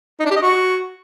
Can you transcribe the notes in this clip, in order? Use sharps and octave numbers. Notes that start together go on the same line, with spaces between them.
D#4
D4
G4
D#5
F#4